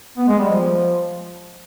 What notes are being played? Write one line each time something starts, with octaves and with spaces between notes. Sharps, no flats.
B3
G#3
G3
F3